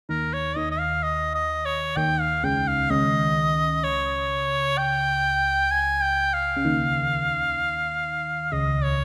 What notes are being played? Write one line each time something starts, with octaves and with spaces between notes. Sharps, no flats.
D#2 D#3 A#4
C#5
D#2 D#3 D#5
D#5
F5
D#5
D#5
C#5
D#2 D#3 G5
F5
C#2 C#3 G5
F5
C#2 C#3 D#5
C#5
G5
G#5
G5
F5
C#3
D#2 D#3
C#2 C#3 D#5
C#5